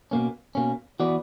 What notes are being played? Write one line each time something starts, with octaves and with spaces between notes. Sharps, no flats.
B2 A#3 C#4
B2 A#3 C#4
E3 B3 F#4 B4 D5